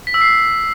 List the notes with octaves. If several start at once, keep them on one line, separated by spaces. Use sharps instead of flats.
B6
E6
C7